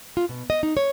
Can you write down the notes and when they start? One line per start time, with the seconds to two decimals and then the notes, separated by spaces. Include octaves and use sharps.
0.17 F4
0.29 B2
0.50 D#5
0.63 D#4
0.77 C#5